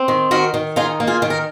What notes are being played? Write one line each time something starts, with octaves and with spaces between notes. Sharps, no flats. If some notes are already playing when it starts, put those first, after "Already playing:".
Already playing: C4
D#3
D#3 F#4 A#4
D#3
D#4 F4 G#4
A#3
F4 G#4
D#3
A#4